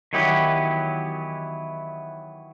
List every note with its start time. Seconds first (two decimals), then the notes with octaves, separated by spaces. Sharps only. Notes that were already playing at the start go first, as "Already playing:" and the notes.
0.13 D#3 E3 F#3 B3 G4